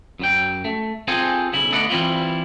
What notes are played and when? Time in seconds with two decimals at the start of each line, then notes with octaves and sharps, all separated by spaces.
0.19 F#2 F#3 G5
0.65 A3
1.08 C4 F4 G#4 A4 C5 G#5
1.53 B1 C#3 E4
1.72 D3 A3 B3 D5 D#5 F#5
1.90 E3 G3 C4 E4 F4